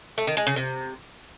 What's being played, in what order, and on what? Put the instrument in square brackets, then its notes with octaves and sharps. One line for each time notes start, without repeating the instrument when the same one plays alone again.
[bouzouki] A3
D#3
G#3
C#3
C3